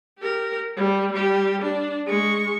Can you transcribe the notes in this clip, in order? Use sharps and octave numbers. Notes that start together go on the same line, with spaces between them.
G4 A#4
G3
G3 G4
D4
G#3 C#6